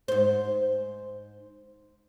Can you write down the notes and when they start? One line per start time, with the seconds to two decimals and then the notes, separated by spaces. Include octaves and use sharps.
0.08 G#2 C5